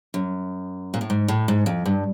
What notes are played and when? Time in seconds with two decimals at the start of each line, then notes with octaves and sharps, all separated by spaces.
0.14 F#2
0.94 A#2
1.01 A2
1.10 G#2
1.28 A2
1.48 G#2
1.66 F2
1.85 G2